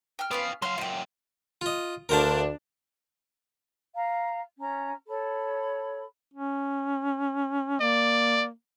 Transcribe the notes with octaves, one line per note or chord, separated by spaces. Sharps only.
G5 F6
B3 C#4 F4 F5 G5
F#3 F5 C6 F6
F#2 A#2 F4 G5
F4 D#5
D2 D4 A#4 C5 F5
F5 A#5
C#4 A#5
A4 C#5 B5
C#4
A#3 D5